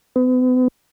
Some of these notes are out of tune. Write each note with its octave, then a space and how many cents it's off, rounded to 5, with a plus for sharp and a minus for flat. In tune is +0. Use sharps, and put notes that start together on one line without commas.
B3 +40